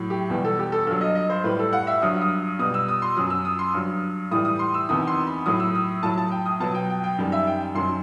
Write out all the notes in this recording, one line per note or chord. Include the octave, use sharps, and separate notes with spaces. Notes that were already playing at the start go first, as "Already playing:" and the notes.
Already playing: A2 F#3
G4
E2 B2 G3 G4
A4
G4
A4
G2 F#3 A4
D#5
D#5
C5
A2 G3 B4
A4
F#5
E5
G2 F#3 D#6
D#6
B2 G3 D#6
E6
D#6
C6
F#2 F#3 D#6
E6
D#6
C6
G2 F#3
A2 E3 G3 D#6
D#6
C6
E6
E2 C3 D#3 D#6
C6
B5
A2 F#3 D#6
E6
D#6
A2 F#3 A5
A5
G5
D#6
B2 F#3 A5
G5
G5
G5
F#2 D#3 G3
E5
G5
F#2 D#3 F#3 C6